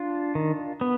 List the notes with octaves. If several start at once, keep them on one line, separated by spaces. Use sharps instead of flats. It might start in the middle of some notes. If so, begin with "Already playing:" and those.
Already playing: D4 F4
D#3
B3